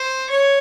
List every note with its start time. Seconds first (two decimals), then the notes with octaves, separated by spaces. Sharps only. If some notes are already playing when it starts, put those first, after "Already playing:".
Already playing: C5
0.30 C#5